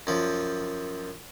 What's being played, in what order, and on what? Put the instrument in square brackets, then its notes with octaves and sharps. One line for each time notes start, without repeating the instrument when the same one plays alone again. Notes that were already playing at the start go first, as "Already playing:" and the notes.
[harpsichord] F#2 F3